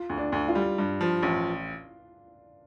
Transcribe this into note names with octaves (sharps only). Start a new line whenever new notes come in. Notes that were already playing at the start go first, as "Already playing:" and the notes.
Already playing: F4
D2
D4
D2
F4
G3
G2
F3
A1